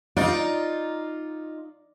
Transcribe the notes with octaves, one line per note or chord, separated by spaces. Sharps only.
D#4 F4 D5